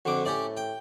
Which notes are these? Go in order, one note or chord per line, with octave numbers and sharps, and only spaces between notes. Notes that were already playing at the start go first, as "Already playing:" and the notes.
F2 D3 F#4 D6
A2 C#4 G4 D5
G5